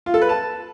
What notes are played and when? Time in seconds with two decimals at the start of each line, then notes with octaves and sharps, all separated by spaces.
0.06 F4
0.14 A4
0.21 B4
0.29 A5